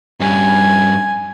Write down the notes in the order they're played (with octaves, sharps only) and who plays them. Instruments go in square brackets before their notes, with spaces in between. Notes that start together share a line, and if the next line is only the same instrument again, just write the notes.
[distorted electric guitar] G2 C#4 [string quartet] G#5